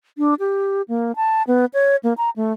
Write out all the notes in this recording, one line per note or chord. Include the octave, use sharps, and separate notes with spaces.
D4
G4
A#3
A5
B3
C#5
A#3
A#5
A3